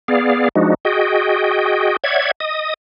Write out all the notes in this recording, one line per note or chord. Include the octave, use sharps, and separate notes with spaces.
B3 G#4 D5 F5
F3 G#3 D4 D#4 F#4
F#4 G#4 D#5 G5
C#5 D5 E5 F#5 G#6
D#5 D#6